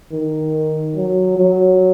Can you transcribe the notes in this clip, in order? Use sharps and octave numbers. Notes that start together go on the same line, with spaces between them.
D#3
F#3
F#3